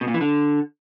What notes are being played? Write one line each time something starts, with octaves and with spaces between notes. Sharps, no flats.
B2
A#2
E3
D3